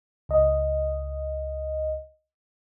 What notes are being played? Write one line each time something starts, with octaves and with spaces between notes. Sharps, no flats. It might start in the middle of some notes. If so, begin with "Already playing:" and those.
C#2 D#5